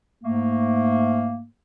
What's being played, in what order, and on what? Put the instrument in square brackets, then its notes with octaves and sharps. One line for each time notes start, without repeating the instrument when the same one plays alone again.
[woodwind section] G#2 A3 A#3